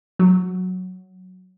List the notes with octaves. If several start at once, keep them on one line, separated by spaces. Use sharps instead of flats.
F#3